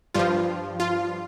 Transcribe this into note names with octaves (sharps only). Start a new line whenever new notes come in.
G2 F3 F4
F4